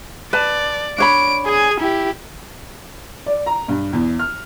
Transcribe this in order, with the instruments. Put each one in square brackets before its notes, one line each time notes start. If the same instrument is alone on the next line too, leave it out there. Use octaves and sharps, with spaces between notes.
[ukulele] B4 A5 [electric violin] D5
[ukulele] D4 C#5 B5 [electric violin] D7
[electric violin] G#4 G#5
E4 G4
[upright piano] D5
A#5
G2
E2
F6